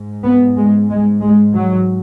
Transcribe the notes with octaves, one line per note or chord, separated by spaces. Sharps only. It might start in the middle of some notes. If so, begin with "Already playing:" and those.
Already playing: G#2
B3
G#3
G#3
G#3
F#3